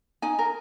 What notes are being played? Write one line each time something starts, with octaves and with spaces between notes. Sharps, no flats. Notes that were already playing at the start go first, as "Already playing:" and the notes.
D#4 G#5
A#4